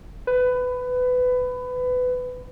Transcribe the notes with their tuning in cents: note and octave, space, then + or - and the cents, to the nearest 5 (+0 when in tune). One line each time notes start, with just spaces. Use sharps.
B4 +20